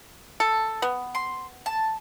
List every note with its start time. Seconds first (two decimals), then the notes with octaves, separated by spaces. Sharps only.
0.40 A4
0.82 B3
1.15 C6
1.66 A5